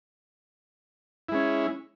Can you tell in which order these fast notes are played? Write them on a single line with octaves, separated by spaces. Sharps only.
E4 G#3 C#4